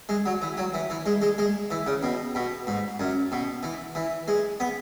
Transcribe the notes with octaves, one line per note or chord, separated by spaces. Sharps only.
G#3
F#3
E3
F#3
E3
E3
G#3
G#3
G#3
E3
C#3
B2
B2
G#2
F#2
B2
E3
E3
G#3
B3